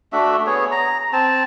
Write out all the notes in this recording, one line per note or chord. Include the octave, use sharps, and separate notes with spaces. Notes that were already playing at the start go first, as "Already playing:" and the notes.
A3 D4 F#4 E5
B3 G#4 C#5
A#5
C4 A5